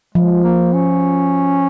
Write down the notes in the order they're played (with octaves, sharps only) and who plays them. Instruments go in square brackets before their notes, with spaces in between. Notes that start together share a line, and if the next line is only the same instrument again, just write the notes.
[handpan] F3 [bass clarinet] G#3
[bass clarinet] A#3
C#4